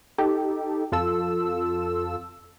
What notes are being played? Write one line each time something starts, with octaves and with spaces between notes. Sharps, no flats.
D#4 G4 A4
F2 F4 A4 E6